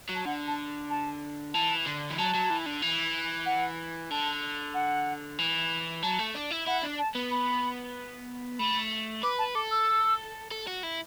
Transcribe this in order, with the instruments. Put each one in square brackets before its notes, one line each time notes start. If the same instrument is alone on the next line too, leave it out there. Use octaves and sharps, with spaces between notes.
[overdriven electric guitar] F#3
[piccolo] A5
[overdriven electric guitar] D3 [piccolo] F#5
[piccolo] A5
A5
[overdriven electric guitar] E3 [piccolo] A5
[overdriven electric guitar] D3
E3
[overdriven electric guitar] F#3 [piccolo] A5
[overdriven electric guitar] F#3
E3
D3
E3
[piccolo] F#5
[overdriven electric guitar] D3 [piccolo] A5
[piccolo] F#5
[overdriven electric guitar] E3
[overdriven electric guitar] F#3 [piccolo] A5
[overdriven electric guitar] A3
D4
E4
[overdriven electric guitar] E4 [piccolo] F#5
[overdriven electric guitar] D4
[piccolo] A5
[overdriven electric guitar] B3
[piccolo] B5
[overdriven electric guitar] A3 [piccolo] B5
[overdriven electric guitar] B4 [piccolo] D6
[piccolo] A5
[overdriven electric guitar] A4 [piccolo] D6
[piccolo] E6
[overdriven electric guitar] A4
F#4
E4